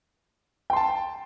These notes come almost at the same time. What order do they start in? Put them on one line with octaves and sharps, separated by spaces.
G5 C6 A5